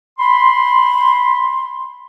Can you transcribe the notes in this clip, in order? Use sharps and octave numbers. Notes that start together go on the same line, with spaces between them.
B5 C6